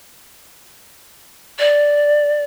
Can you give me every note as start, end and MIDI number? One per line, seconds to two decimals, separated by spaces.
1.59 2.44 74